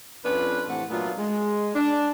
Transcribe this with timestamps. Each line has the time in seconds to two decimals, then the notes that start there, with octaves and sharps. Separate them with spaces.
0.25 F2 C#4 D4 F4 B4
0.68 A2 C3 E3 A3 C4 F#5
0.90 A#2 F#3 A3 B3 D4 F4
1.18 G#3
1.75 D4